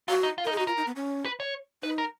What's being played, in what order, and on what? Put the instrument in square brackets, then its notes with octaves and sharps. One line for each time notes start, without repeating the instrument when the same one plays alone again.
[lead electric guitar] F4 [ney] F#4
[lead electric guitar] D#4
F4
[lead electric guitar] D#4 [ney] A#4
[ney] G#4
[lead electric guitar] D#4 [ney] F#4
[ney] F4 [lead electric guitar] A#4
[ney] D#4
B3
C#4
[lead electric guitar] B4
C#5
[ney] D#4 [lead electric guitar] B4
[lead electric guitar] A#4